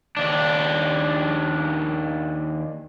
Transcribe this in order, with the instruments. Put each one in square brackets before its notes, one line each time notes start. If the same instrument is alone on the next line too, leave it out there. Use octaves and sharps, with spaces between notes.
[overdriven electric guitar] D#2 D4